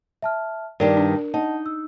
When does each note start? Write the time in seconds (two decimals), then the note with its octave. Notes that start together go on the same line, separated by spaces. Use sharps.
0.22 E5 A5 F6
0.80 G2 D#3 G3 A#4 D5
0.97 D4
1.34 D#4 D#5 F#5 A5
1.66 E6